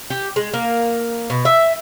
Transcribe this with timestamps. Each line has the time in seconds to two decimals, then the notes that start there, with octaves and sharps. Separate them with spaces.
0.10 G4
0.36 G#3
0.54 A#3
1.30 B2
1.45 E5